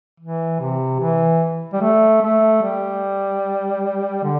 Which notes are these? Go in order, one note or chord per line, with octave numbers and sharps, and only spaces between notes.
E3
C3
E3
G3
A3
A3
G3
D3